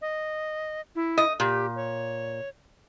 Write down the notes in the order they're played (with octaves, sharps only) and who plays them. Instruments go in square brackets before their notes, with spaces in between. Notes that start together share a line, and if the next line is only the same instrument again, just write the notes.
[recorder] D#5
E4
[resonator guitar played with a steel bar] D#5
[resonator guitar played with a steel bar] A#2 [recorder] G4
[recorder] C#5